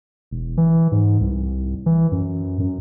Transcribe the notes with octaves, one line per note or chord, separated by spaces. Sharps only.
E1
E3
G#2
C2
E3
F#2
F#2